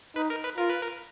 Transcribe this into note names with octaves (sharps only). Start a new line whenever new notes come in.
D#4 B4
A#4
B4
F4 A#4
B4
A#4